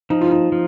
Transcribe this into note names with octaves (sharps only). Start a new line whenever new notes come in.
F3 D#4
F4
D#4
F3